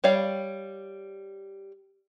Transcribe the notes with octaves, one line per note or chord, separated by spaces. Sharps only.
G3 C#5 D5 F5 B5